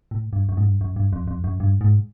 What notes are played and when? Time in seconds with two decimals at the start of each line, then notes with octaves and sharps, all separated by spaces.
0.11 A2
0.33 G2
0.49 F#2
0.57 G#2
0.65 G2
0.81 F#2
0.96 G2
1.13 F2
1.27 F2
1.44 F#2
1.60 G2
1.81 G#2